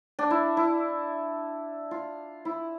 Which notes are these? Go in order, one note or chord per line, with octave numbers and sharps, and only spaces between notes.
D4
E4
E4
F4
E4